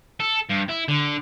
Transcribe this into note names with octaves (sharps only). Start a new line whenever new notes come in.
A4
G2
E4
D3